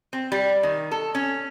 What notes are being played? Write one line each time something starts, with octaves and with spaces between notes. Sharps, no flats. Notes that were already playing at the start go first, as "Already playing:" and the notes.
C4
G3
D#3
A4
C#4